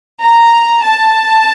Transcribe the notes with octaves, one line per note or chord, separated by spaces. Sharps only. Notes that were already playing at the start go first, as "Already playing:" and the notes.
A#5
A5